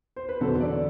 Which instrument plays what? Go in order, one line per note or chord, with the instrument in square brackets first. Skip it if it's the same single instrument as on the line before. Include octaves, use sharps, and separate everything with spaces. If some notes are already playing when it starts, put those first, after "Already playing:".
[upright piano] C5
B4
E2 D3 F#3 A4
D5